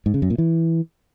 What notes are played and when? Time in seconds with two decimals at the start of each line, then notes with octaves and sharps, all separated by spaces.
0.06 G#2
0.14 C#3
0.22 F#2
0.30 A#2
0.38 E3